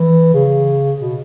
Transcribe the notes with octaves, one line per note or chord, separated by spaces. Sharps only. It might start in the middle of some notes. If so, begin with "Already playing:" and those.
Already playing: E3
C#3
B2